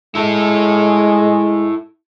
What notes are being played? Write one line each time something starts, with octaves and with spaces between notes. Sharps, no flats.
G#3 E4 A4